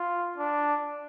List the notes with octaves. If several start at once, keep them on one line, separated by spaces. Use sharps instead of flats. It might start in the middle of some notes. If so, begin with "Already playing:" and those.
Already playing: F4
D4